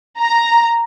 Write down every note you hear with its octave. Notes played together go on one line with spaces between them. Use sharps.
A#5